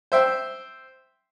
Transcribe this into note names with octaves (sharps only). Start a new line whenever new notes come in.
C5 E5 G5